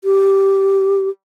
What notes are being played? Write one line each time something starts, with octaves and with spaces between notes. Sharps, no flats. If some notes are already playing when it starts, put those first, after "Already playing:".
G4